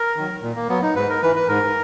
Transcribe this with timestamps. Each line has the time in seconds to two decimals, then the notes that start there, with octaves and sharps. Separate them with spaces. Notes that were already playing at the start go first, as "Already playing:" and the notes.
Already playing: A#4
0.17 D#3 F#3
0.42 A#2
0.56 A#3
0.69 F#3 B3
0.82 D#4
0.96 G#2 B4
1.10 A#4
1.22 E3 B4
1.35 B4
1.48 G#2 A#4